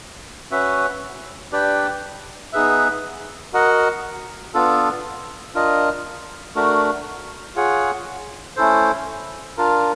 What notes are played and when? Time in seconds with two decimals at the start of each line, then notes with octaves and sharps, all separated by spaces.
0.51 C#4 F#4 B4 E5
1.52 D4 G4 B4 D5 G5
2.53 B3 D#4 G#4 B4 E5
3.53 F#4 A#4 D#5 F#5
4.54 B3 D4 F4 A4
5.54 D4 F4 A#4 D#5
6.55 A3 D4 F#4 A#4
7.56 F4 G#4 C#5 F#5
8.56 A3 C#4 E4 A4 C5
9.57 D4 F4 A#4